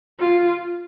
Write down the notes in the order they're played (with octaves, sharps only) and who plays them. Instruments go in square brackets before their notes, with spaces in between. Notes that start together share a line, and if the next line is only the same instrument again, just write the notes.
[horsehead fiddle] F4